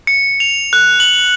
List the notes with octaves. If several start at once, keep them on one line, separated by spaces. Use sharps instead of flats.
C#7
F7
F#6
F#7